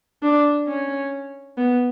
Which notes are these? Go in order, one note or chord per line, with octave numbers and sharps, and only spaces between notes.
D4
C#4
B3